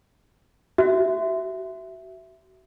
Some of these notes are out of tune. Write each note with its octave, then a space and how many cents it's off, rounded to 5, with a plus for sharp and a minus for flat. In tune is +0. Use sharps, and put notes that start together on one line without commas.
F#4 +35 E5 +5